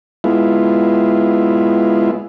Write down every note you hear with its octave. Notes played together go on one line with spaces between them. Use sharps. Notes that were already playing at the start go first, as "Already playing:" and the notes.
G#3 B3 E4 F4